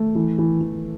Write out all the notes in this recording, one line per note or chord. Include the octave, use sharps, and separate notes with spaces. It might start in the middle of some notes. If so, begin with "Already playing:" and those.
Already playing: A3
E3
E3
E3